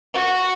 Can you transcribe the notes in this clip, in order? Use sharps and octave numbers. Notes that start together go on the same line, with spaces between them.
F#4